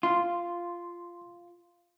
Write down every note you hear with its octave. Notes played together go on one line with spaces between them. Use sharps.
F4 C6